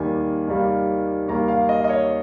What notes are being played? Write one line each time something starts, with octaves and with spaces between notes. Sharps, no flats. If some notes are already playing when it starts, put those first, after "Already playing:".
Already playing: D#2 D#3 G3 A#3 G#5
D#2 D#3 G3 A#3
D#2 D#3 G3 A#3 A#5
F5
D#5
D#5
C#5